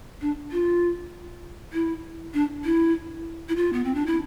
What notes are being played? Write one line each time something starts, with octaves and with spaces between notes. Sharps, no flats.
D4
F4
E4
D4
E4
E4
F4
B3
C4
D4
E4